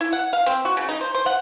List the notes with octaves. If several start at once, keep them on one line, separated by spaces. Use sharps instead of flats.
E4
F#5
F5
C4
F#4
C#3
D#4
C5
C5
F#5